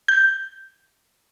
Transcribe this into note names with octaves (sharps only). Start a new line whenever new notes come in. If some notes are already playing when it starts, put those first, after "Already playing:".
G6